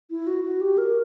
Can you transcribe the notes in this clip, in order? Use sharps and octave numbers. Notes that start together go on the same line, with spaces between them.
E4
F#4
F#4
G4
A#4